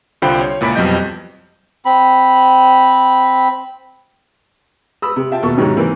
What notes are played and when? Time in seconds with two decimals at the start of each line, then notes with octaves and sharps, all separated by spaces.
0.22 C2 D3 F4 C5 G5 B5
0.41 C#5
0.61 C#2 A#2 E4 B5 B6 D7
0.75 F2 B2 F#3 G3 D#5 G6
1.85 C4 B5
5.02 B5 D#6 E6
5.16 C3
5.31 F4 E5 G5 A5
5.42 D#2 B2 A4 C#6
5.57 G#2 C3 D#3 F#3 C#4 D#4
5.77 E3 A#3 C4